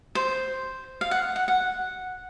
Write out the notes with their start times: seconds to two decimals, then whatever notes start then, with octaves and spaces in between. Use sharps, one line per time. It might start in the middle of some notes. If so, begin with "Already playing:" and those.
0.15 C5
1.01 F5
1.11 F#5
1.36 F#5
1.48 F#5